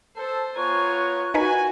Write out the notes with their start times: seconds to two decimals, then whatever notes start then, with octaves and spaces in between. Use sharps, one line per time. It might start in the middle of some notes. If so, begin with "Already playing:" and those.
0.16 A4 C5
0.56 B3 F4 C#5 G#5 A#5 C#6 F#6
1.34 D#4 F#4 A#4 B4 G#5